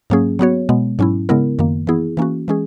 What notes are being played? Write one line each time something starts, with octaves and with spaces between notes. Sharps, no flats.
G#2 F#3 A#3 C#4 G#4
F#3 B3 F#4 C#5
B2 G#3 B3
G#2 F#3 C#4 E4
C#3 G#3 B3 E4 A#4
F#2 D#3 A#3
E3 B3 E4 G#4
E3 A#3 C#4 F#4
E3 G#3 C#4 G#4